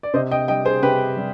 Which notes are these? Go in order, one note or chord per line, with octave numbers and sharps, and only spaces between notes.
D5
C3 C5 D#5
D#5 G5
G3 D#5 G5
G#4 C5
C3 G4 B4
G3